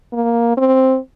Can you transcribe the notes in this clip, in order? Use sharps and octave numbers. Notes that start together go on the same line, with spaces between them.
A#3
C4